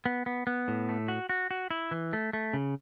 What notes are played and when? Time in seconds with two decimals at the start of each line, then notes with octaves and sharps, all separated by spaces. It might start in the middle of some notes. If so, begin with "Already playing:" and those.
0.06 B3
0.26 B3
0.47 B3
0.68 A2
0.89 A3
1.08 F#4
1.29 F#4
1.51 F#4
1.71 E4
1.91 E3
2.13 A3
2.33 A3
2.53 C#3